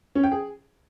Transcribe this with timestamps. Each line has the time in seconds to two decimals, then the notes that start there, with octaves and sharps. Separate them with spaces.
0.15 C#4
0.24 G5
0.32 G#4